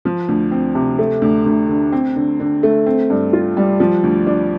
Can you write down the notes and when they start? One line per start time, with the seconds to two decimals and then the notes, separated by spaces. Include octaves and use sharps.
0.05 F3
0.28 D2
0.51 C4
0.75 C3
0.99 A3
1.22 D2
1.46 D2
1.68 D3
1.92 C4
2.16 D3
2.40 D3
2.63 A3
2.86 C4
3.10 G2
3.33 F4
3.57 G3
3.80 F3
4.03 D2
4.27 D4